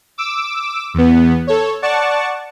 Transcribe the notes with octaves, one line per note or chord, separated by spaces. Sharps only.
D6 E6
E2 B3
A4 C#5
D5 F#5 A5 C#6